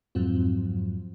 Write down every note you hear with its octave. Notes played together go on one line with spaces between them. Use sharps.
F2 G#2 F3 F#3 C4